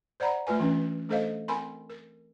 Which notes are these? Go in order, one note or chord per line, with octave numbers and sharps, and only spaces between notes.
C5 D5 F#5 A#5 B5
A3 F4 B4 G#5
E3 C#4 D4
A3 D4 A4 C5 D#5 F5
C4 A#4 G#5 B5 C6
A#4